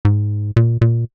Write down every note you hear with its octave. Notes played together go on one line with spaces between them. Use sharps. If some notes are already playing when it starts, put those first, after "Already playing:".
G#2
A#2
A#2